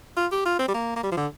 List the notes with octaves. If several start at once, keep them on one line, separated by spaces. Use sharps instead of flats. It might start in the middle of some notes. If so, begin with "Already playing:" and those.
F4
G4
F4
C4
G3
A#3
A#3
G3
F3
D3